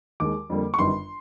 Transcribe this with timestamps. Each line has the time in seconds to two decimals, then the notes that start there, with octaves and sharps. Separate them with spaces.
0.20 D#2 D#3 G#3 D6
0.50 F2 D3 G3 A#3
0.74 C#6
0.79 G1 F#2 D#3 G3 C6